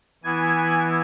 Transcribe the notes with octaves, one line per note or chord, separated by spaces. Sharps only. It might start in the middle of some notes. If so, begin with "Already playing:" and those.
E3 B3 E4 G#5